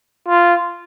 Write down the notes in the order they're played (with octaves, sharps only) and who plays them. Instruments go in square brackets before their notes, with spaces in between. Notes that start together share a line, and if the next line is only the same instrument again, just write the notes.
[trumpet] F4